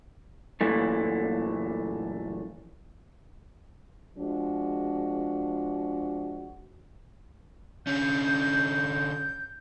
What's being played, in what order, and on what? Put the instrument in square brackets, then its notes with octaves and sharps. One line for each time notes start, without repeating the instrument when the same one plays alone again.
[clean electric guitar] F#2 A#2 E3 A3
[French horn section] F3 G#3 D4 F#4
[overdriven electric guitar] D3 C#4 [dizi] G6